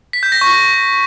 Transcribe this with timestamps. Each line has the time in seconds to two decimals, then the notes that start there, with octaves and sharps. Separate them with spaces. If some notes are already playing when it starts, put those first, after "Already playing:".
0.13 B6
0.23 G6
0.32 A#6
0.41 C#6